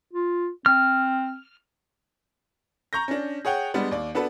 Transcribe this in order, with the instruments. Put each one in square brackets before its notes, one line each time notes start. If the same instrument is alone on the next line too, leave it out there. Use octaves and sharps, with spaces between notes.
[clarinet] F4
[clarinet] C4 [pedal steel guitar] F6
[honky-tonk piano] A#5 C#6 G6 A#6
C#4 D4
G#4 C#5 F#5 G5
G3 G#3 B3 D4
D#2 D5
B3 D4 F#4 A4 B4